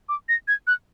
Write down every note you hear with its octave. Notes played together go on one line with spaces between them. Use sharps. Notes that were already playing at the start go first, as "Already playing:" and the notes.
D6
A#6
G#6
F#6